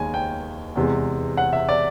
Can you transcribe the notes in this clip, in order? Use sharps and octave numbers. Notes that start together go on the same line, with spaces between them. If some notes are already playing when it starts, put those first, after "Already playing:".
Already playing: D#2 D#3 G#3 G#5
G5
E2 C3 E3 G#3
F#5
E5
D5